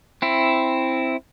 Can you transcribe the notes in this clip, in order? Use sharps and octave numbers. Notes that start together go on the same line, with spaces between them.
C4 E4